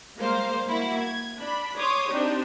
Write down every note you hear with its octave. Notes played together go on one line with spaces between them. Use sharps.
G3 G#3 A#3 C5 F5
A#3 E4 F#4
G#6
D4 B5
C#5 C6 D6 D#6
C4 D4 D#4 G4